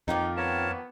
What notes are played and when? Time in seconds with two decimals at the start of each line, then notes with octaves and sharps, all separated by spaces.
0.08 F2 D#3 F3 A#3 D#4
0.37 B3 A#4 C#5 A5